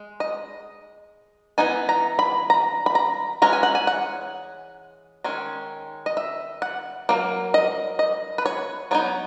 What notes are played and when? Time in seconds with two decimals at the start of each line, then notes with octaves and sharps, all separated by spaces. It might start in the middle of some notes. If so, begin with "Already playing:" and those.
Already playing: G#3
0.20 D#5
1.58 E3 B3 D#4 G#5
1.89 A#5
2.19 B5
2.50 A#5
2.86 B5
2.95 A#5
3.42 E3 G#3 C#4 A#5
3.53 G#5
3.63 F#5
3.75 G#5
3.87 F#5
5.24 D#3 G#3 C#4
6.06 D#5
6.17 E5
6.62 F#5
7.09 F#3 A#3
7.54 D#5
7.99 D#5
8.38 B4
8.46 C#5
8.91 F#3 B3 D#4 C#5